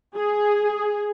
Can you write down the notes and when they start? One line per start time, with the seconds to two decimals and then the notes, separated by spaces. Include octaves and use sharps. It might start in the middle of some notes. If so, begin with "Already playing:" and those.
0.16 G#4